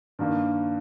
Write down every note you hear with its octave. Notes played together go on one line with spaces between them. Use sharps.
G2 D#3 A#3